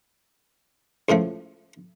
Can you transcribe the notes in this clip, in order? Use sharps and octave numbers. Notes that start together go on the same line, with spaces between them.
C#2 A2 F3 A3